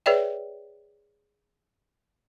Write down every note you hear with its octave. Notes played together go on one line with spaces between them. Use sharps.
G#4 B4 C#5 D5 E5 G5